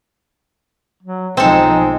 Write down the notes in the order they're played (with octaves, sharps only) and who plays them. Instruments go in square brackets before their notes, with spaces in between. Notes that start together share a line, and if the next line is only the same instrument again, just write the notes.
[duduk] F#3
[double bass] B1 F3 [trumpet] G#3 [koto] C4 A4 [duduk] D#4